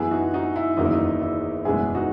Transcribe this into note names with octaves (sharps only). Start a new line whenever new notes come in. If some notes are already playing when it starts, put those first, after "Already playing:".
Already playing: F#2 E3 B3 E4 G#4
D#4 F#4
D#4 F#4
E4
F#1 E2 D#3 F#3 A#3 D#4
E4
D#4
E4
F#1 E2 B2 G#3 B3 E4 G#4
D#4 F#4